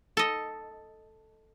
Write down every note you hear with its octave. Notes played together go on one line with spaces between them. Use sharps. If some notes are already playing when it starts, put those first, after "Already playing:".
A4 D#5